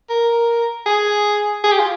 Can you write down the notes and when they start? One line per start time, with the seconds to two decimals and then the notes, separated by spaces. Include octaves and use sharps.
0.10 A#4
0.86 G#4
1.64 G#4
1.71 G4
1.80 F4